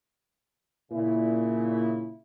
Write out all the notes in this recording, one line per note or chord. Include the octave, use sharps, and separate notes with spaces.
A#2 C#3 E4